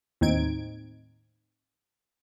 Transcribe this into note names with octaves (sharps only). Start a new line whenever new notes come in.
D#2 A2 C4 D#4 G#6 D7